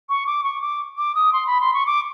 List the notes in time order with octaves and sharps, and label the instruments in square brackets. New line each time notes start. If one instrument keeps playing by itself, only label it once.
[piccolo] C#6
D6
C#6
D6
D6
D#6
C6
B5
C6
C#6
D6